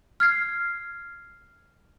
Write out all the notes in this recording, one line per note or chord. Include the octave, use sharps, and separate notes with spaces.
F6 G#6 C7